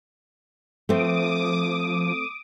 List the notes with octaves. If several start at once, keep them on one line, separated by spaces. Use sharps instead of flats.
F3 A3 C4 D6 D#6